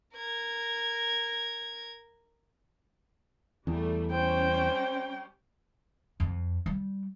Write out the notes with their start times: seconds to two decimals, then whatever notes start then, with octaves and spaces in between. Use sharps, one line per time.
0.14 A#4 G#6
3.67 E2 G3 A3
4.12 G3 C#4 C5 G5
6.20 F2
6.66 G3